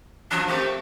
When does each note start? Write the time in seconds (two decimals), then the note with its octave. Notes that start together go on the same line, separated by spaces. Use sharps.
0.31 F3 F#3 D4
0.48 A3 A#3 C4 G4